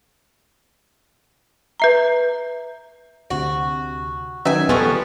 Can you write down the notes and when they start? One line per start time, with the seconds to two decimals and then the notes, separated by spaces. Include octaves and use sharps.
1.80 B4 E5 A#5
3.30 D2 C3 F#4
4.45 D#3 F#3 C#4 D#4 B4 E5 G#5 A#5
4.69 F3 G3 B3 F#4 G#4 A4 B4